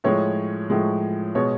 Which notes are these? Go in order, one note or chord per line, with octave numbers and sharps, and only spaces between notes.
A2 F3 G#3 C#5
A2 F3 G#3
B2 G#3 C#5